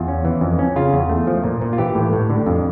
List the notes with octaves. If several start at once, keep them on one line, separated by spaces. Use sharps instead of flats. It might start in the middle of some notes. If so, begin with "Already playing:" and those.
Already playing: E2 F4
C#4
E3
F2
C#4
C#3 F4
E2
A3
F3
A#2
A#2
F4
E3 G4
A2
A2
D3
F2